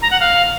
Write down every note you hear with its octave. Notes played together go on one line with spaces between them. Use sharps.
A#5
F#5
F5